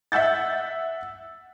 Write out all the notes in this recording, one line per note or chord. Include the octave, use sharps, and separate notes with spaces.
E5 F#5 E6 G6 A6